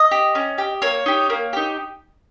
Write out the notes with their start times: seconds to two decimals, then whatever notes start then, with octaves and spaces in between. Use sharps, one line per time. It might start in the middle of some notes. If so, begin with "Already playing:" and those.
Already playing: D#5
0.11 G4
0.35 C#4
0.58 G4
0.82 A#3 C#5
1.06 D#4 G4
1.30 A#3
1.53 D#4 G4